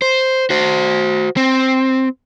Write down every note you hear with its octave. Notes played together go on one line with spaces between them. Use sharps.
C5
F#4 C5
C4